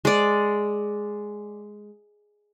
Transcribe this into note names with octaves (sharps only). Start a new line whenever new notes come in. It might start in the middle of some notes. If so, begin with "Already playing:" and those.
G#3 D5